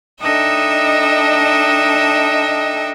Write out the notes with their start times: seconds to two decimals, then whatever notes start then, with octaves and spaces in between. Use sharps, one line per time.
0.21 D4 D#4 A4 D#5 E5 G5